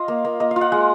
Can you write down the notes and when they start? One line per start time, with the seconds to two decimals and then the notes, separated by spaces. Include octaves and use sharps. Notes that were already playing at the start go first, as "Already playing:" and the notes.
Already playing: F4 D#5 F5
0.08 A#3
0.25 A#3
0.40 A#3 D#5
0.51 F5
0.56 F4
0.61 F#5
0.72 G#3 F#5